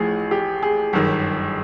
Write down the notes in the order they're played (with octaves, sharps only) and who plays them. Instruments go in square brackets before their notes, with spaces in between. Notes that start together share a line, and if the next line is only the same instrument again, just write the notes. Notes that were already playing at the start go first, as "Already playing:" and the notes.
Already playing: [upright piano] A1 A2 F3 [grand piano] G#4
[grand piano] G4
G#4
[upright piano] G1 F#2 D#3